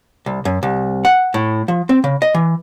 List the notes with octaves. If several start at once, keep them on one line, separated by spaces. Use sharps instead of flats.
C2
F#2
C2
F#5
A2
F3
C4
C#3
D#5
E3